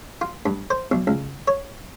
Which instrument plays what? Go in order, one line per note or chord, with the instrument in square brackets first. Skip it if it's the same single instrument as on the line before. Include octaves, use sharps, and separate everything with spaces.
[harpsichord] F4
G2
C5
B1
C#2
C#5